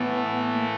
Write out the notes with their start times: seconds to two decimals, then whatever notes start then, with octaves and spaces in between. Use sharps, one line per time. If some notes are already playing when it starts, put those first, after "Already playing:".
Already playing: A2 E3 A3 B3
0.53 A#3